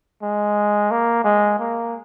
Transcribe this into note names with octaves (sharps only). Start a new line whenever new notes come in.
G#3
A#3
G#3
A#3